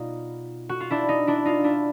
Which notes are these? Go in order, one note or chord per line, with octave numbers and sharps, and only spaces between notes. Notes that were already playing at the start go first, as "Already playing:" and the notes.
Already playing: B2 G3 B3 D#4 F4
F#4
F4
D4 E4
D#4
D4 E4
D#4 F4
D4 E4